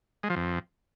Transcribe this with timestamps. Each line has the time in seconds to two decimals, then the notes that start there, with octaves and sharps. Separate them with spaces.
0.23 G#3
0.30 F3
0.36 F2